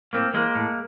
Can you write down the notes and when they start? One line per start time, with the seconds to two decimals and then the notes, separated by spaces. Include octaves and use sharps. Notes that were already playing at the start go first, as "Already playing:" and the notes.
0.13 A2 A#3 C4
0.34 E3 G#3 A#3
0.55 A2